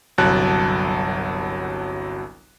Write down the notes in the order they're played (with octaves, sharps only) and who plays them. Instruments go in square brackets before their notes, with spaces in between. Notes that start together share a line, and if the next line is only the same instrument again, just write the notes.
[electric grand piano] G1 C2 F#3 A5 F#6